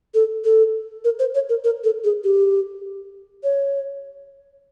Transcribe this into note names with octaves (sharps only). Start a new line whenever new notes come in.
A4
A4
A#4
C5
C#5
A#4
A#4
A4
G#4
G4
C#5